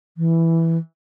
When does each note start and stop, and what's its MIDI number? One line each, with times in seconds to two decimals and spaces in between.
0.17 0.77 52